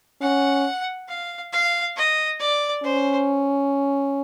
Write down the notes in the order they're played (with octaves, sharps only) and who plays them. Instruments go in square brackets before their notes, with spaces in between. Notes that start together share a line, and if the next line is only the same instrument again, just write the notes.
[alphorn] C#4 [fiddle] F#5
[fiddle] F5
F5
D#5
D5
[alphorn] C#4 [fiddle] C5